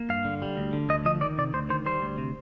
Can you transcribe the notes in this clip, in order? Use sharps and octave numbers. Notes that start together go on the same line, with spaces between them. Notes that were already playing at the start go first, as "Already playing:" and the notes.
Already playing: A#3
G2 F5
D3
G3
D2
D3
D2 D#5
F3 D#5
D#3 D5
C3 D5
D2 C5
D#3 C5
G3 C5
D2
C3